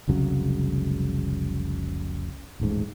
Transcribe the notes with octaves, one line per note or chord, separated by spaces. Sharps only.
F1 C2 C#3 F#3
D#1 A1 G#2